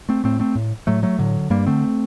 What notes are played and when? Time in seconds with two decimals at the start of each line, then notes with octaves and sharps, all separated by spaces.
0.09 A3 C4
0.24 A2 A3 C4
0.40 A3 C4
0.55 A2
0.87 A2 F#3 A3
1.03 F#3 A3
1.19 A2 D3 F#3
1.50 G2 G3 A#3
1.66 D3 A3 C4